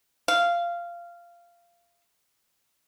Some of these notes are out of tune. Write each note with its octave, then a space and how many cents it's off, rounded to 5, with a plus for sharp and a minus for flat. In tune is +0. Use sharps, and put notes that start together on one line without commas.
F5 -15